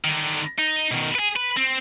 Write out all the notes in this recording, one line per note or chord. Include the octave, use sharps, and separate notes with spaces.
D3 D#3
D#4
B2 D#3
G#4 B4
B4
C4